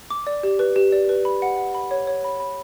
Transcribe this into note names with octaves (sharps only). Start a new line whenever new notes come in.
D6
D5
G4
B4
G4
D5
B4
B5
F#5
F#5
B5
C#5
C#5
B5
B5